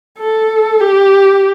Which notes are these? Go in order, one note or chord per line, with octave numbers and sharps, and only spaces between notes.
A4
G4